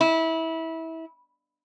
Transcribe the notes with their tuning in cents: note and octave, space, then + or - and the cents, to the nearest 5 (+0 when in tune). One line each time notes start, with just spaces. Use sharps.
E4 -25